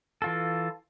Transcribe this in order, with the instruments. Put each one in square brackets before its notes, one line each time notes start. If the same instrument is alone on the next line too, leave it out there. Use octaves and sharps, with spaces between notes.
[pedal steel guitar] E3 F4 A4